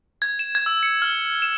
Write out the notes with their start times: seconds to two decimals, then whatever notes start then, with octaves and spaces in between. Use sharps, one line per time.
0.22 G#6
0.39 E7
0.55 G#6
0.66 E6
0.83 C#7
1.02 F6
1.42 E7